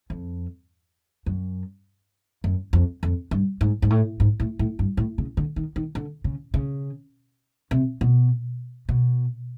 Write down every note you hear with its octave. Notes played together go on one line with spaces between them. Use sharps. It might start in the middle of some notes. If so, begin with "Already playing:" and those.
F2
F#2
F#2
F2
F2
G2
G#2
G#2
A2
G#2
A2
A2
G2
A2
C#3
D3
D#3
D#3
D3
C#3
C#3
C3
B2
B2